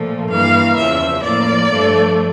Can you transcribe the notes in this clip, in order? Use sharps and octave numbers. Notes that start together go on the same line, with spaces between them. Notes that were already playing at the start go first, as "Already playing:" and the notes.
Already playing: A#2 F3 A3
G2 E3 A#3 F5
E2 C#3 F3 E5
A2 F3 A#3 D5
G2 F3 A3